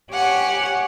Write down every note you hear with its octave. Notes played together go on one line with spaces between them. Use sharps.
G4 C#5 F#5 G#5